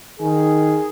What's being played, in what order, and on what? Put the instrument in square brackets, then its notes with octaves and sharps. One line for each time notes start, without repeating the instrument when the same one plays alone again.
[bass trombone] D#3 [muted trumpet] G#4